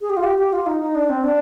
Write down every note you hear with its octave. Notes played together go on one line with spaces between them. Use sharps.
G#4
G4
F4
G4
G4
F4
D#4
D#4
D4
C4
D4